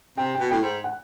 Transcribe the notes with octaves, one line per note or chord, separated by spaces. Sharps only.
C3 G5
B2 G5
A2 G5
G#2
F#5